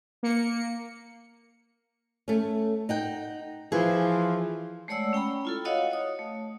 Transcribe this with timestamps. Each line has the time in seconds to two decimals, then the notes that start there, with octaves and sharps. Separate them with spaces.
0.23 A#3 C#7
2.28 A3 C#4
2.89 D#4 F#5 G5
3.72 E3 F3 G#4
4.88 G#3 A3 C#5 D5 F#5 E6
5.13 C#4 G5 A#5 B5
5.45 E4 F4 A4
5.65 F#4 C#5 D#5 F5 F#5 D#6
5.91 C#5 D#6
6.19 A3